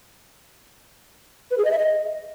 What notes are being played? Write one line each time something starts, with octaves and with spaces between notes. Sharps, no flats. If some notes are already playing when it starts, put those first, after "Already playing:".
B4
G#4
D#5
E5
D#5